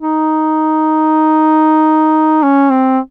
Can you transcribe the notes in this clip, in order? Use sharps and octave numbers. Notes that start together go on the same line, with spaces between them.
D#4
C#4
C4